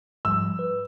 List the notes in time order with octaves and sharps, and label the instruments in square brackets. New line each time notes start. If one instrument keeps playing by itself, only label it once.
[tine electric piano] G#2 F3 G3 [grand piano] E6
[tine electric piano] B4